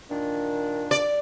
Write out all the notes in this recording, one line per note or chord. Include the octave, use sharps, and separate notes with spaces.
A#2 D#3 D4
D5